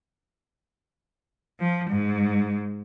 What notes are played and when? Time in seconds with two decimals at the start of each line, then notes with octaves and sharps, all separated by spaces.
1.60 F3
1.90 G#2